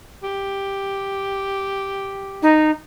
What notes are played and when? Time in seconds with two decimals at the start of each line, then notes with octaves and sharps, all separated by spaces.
0.23 G4
2.42 D#4